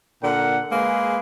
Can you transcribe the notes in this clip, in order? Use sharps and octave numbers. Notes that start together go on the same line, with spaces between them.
A#2 D3 A#4 F#5
G#3 A#3 G#4 B4